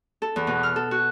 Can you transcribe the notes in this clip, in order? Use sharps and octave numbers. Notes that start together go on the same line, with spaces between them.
A4
E2
B2
F6
A4
F#4